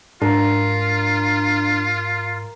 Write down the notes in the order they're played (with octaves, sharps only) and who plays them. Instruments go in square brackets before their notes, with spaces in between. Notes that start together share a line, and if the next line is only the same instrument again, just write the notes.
[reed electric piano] G#2 [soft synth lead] D4 [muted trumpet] F4 [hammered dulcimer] A#4